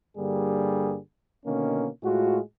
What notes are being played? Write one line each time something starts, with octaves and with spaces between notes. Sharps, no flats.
G2 D3 G3 A#3 G#4
B2 D3 D#3 A#3 C#4
A2 G#3 F4 F#4